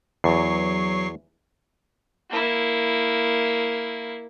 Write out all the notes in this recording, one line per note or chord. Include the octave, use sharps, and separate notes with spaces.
E2 F#3 C#6 C7
A#3 E4